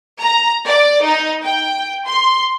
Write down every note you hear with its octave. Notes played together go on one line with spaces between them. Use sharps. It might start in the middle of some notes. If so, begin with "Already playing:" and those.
A#5
D5
D#4
G5
C6